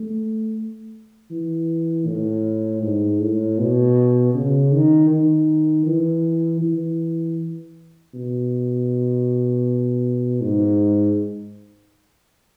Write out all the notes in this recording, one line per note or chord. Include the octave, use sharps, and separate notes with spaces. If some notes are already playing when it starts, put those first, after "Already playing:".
Already playing: A3
E3
A2
G#2
A2
B2
C#3
D#3
D#3
E3
E3
B2
G#2